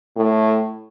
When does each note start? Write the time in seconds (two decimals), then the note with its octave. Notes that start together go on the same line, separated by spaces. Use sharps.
0.16 A2